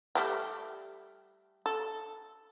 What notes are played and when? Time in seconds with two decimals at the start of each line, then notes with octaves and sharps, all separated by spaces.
0.15 G3 A3 G5
1.66 A4